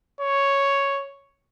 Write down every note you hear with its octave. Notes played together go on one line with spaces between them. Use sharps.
C#5